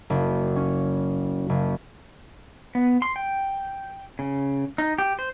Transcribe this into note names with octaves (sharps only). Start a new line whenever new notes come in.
F#1
C#4
F#1
B3
C6
G5
C#3
D#4
G4
C5